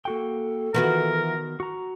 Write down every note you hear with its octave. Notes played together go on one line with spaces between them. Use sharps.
A#3 F#4 A4 G5
D#3 E3 B3 F4 F#4 A#4 E5
F#4 A#5